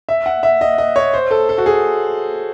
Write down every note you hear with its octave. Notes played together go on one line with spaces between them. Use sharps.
E5
F#5
E5
D#5
D#5
C#5
C5
A4
A4
F#4
G#4